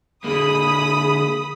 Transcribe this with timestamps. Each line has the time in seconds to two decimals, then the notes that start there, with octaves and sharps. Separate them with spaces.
0.24 D3 A#3 G#4 B5 D#6